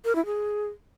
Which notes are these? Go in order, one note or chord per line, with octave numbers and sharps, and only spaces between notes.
A#4
E4
G#4